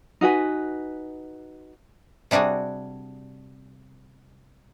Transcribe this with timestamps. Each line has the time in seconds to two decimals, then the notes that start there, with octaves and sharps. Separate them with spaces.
0.21 D#4 F#4 B4 G#5
2.31 C3 G3 D4 F#4 G#4